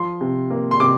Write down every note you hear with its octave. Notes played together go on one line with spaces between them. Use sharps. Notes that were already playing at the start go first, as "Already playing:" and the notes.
Already playing: F3 C6
C3
A#3
C6
C3 D6